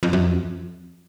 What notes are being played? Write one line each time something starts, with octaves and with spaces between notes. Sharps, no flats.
F2
F#2
F2